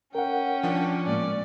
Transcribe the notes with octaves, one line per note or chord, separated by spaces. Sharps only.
C#4 A#4 F#5 G5
F3 D4
A2 G#3 A#3 D5